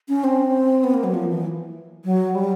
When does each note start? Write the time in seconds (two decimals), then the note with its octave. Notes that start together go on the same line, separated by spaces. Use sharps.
0.08 C#4
0.24 C4
0.84 B3
0.94 A#3
1.04 F#3
1.14 F3
1.29 E3
2.05 F#3
2.35 G3